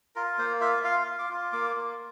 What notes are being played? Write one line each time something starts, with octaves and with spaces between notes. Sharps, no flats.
F4 A#4
A#3 C5
F4 E5
F4 F5
F4
D6
F4
A#3 D6
A#3